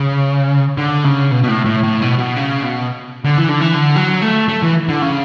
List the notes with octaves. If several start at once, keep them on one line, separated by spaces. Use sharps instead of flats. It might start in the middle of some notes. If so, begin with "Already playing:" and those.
Already playing: C#3
D3
C#3
B2
B2
A2
A2
A2
B2
B2
C#3
B2
D3
E3
D3
E3
D3
F#3
A3
A3
E3
D3
C#3